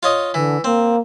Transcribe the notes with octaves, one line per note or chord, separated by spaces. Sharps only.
F4 C#5 D#5
D3 E3
A#3 C4